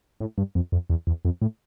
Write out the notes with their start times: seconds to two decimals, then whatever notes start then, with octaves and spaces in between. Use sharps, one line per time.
0.20 A2
0.38 G2
0.55 F2
0.72 F2
0.90 E2
1.07 E2
1.25 F2
1.41 A2